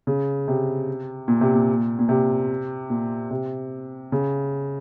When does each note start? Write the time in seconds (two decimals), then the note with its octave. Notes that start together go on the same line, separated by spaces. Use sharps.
0.07 C#3
0.48 C3
1.28 A#2
1.41 C3
1.54 A#2
1.99 A#2
2.09 C3
2.90 A#2
3.31 C3
4.12 C#3